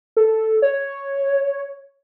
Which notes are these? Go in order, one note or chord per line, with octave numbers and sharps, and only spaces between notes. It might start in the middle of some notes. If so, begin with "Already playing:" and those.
A4
C#5